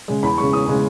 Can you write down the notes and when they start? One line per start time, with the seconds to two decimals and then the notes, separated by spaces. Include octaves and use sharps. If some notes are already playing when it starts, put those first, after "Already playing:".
0.08 C#3 G#3
0.23 E2 B5
0.38 C#3 G#3 C#6
0.53 E2 D#6
0.68 C#3 G#3